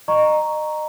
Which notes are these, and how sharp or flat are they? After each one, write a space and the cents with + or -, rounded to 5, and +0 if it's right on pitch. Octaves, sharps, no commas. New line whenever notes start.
D#5 -30 A#5 +0 C#6 +0